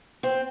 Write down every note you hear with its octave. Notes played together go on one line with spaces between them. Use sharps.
C4